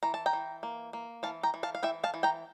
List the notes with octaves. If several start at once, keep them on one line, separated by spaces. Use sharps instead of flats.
E3 A#5
A5
G5 A#5
E3
A#3
A#3
E3 F5 A5
G5 A#5
E3
F5 A5
F5
E3 E5 G5
F5 A5
E3
G5 A#5